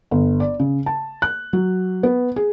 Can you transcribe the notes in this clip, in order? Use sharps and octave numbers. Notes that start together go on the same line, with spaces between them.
G1
D5
C#3
A5
F#6
F#3
B3
G#4